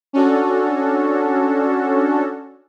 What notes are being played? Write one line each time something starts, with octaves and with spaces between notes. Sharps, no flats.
C#4 D4 F#4 A4